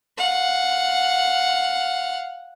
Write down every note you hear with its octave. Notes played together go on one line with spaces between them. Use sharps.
F5 F#5